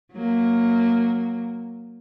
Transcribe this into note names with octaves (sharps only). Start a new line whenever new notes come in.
F#3 A#3